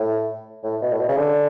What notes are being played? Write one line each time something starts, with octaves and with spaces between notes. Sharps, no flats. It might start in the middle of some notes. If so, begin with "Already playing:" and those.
Already playing: A2
A2
B2
A2
B2
C#3
D3